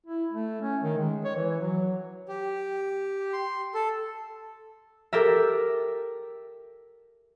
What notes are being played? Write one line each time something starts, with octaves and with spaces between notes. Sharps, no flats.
E4
A3
C#4
D#3
G#3
C#5
E3
F#3
G4
C6
A4
G4 A4 A#4 E5